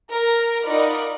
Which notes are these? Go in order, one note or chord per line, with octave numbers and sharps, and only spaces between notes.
A#4
D#4 F4 A#4 D5 F#5 B5